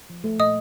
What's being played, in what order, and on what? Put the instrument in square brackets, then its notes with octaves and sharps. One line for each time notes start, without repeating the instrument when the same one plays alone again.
[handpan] F3
A3
[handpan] A#2 [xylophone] D#5 D#6